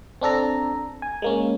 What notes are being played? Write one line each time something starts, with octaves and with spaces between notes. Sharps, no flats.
C4 D4 A4 A#5
G#5
G#3 A#3 C#4